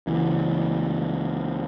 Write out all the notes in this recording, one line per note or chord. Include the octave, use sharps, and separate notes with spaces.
C#2 E3